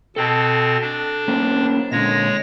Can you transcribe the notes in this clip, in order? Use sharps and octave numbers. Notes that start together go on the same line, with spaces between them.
B2 C4 A4 A5
D4
A#3 C4 C#4
A#2 D3 G#3 C#5 A#6